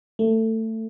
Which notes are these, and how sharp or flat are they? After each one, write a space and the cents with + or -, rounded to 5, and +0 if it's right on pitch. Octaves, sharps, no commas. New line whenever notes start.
A3 +20